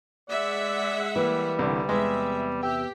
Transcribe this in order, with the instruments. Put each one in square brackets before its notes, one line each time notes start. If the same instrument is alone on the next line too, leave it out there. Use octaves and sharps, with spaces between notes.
[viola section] G#3 E5 F#5 [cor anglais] D5
[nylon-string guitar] E3 A#3 [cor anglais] G3
[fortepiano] C2 D3
[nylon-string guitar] E2 C3 [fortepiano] G#3 [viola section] E5
[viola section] G4 [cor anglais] E5 [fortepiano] G5